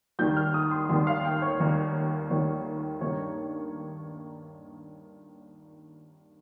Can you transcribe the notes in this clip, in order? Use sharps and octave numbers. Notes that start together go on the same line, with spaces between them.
D#2 D#3 G3 A#3 G6
F6
D#6
C6
D#2 D#3 G3 A#3 C6
F5
G5
C#5
D#2 D#3 G3 A#3 C#5
D#2 D#3 G3 A#3 C#5
G2 D#3 A#3 D#4 C#5